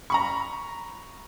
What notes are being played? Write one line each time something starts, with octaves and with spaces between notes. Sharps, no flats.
A#5 B5 C#6